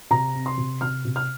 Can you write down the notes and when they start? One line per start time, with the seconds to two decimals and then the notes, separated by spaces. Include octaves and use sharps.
0.11 C3 A#5
0.34 C4
0.46 C6
0.58 C3
0.81 C3 F6
1.05 C3
1.16 F6